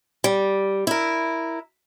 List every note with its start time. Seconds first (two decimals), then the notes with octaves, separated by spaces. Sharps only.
0.24 G3
0.87 E4 A#4